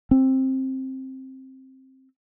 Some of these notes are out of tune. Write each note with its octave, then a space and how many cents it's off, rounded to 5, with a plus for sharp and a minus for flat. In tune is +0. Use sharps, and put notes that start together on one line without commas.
C4 +10